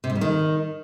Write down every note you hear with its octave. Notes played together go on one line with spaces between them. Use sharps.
C3
G#2
G3
D#3